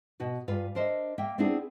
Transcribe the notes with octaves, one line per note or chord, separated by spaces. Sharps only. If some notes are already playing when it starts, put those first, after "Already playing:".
B2 F#4 B4
G2 F4 B4 G#5
D4 A#4 C5 D#5 E5
A#3 E5 G5
B3 C4 D4 E4 G#4 C5